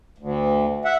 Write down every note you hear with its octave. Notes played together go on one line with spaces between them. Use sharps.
D2
E5 F#5